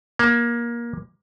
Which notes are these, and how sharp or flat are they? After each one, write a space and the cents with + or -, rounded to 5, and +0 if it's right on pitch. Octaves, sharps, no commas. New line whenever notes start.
A#3 +20